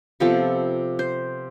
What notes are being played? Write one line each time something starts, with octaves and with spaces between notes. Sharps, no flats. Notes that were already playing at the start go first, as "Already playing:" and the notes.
C3 F3 B3 A4
C5